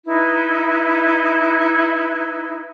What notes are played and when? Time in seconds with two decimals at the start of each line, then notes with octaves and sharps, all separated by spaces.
0.06 D#4 E4 B4